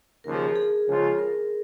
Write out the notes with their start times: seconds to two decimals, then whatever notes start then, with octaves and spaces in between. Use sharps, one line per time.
0.23 D#2 C#3 F3 A#4
0.34 G#4
0.44 G#4
0.56 G#4
0.87 C#2 C#3 F3 C#4 F4
1.18 A#4